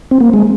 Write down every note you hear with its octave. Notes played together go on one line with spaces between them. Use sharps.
C4
A#3
G#3